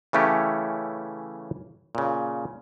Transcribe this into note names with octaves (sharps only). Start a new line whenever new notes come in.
C#3 E3 A3 C#4 G4
A#2 C#3